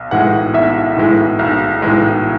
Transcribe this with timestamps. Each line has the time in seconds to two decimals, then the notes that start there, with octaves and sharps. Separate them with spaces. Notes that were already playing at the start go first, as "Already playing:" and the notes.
Already playing: B1
0.11 A2 E3 G#3 F#5
0.54 B1 E5
0.97 A2 E3 G#3
1.39 B1
1.82 A2 E3 G#3